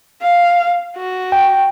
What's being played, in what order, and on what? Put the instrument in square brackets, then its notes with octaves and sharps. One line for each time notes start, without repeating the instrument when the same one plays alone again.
[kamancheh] F5
F#4
[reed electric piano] G5